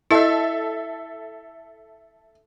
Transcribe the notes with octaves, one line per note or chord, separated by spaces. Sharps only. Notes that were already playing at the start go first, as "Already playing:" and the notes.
E4 A4 D#5 E5